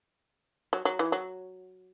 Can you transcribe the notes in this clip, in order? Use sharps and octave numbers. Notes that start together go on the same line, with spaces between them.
F#3
F#3
E3
F#3